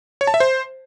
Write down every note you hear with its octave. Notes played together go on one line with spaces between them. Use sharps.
C#5
A5
E5
C5